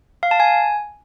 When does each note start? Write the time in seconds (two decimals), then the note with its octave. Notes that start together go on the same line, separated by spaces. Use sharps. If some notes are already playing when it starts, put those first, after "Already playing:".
0.23 F5
0.31 A5
0.40 G#5